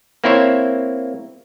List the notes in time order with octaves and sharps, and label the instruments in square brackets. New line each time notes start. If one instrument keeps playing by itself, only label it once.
[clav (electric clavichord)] A#3 C4 E4 C5 C#5 E5